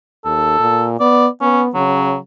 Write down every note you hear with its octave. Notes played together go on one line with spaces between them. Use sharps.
D#2 A4
A#2
B3 D5
B3 C#4
C#3 F#3